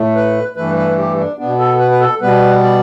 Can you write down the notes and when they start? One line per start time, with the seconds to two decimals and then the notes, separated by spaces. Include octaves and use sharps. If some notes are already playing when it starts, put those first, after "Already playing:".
Already playing: A2 A3
0.16 B4
0.56 G2 E3 A3 B4
0.77 B4
0.98 G4
1.18 D4
1.38 B2 B3 D4
1.59 A4
1.79 B4
1.91 B4
2.00 A4
2.21 B2 G3 B3 B4
2.62 D5